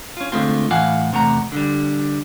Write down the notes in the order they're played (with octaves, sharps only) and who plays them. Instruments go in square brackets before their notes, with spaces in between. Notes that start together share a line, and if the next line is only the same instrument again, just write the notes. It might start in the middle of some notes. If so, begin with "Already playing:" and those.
[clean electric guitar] C#4 F4
D3 G#3 A3 C4 F4
A2 E3 F5 F#5 G#5
E2 C3 A3 F#5 A#5
D3 G3